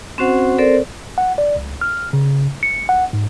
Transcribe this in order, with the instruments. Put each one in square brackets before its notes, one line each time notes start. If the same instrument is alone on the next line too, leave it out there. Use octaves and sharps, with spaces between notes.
[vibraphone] C4 C#4 F#4 C5 F#5
C4 A4 A#4 C5 D5
[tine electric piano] F#5
D5
C#2
F6
C#3
C#7
F#5
G#2